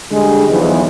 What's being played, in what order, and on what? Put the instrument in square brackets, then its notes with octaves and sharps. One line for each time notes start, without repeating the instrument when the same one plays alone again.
[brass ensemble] D3 G3 G#3
B1 E2 E3 F3